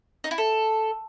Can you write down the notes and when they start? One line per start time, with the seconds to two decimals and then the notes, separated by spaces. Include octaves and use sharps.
0.24 D#4
0.31 E4
0.38 A4